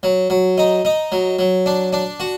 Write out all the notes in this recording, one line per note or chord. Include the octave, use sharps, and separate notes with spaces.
F#3
F#3
D#4
D#4
F#3
F#3
D4
D4
F#4